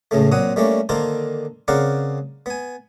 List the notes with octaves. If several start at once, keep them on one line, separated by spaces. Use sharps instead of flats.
C#2 A2 C#3 A3
A#2 F#3 C4 F#5 D#6
G3 A3 A#3 C#4 D4
D3 D#3 A#3 A4 A#4 C5
C#3 C4 A#4 D5 F5 F#5
B3 G#5